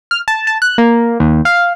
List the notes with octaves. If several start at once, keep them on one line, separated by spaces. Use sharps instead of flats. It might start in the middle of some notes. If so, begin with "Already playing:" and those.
F6
A5
A5
F#6
A#3
D#2
F5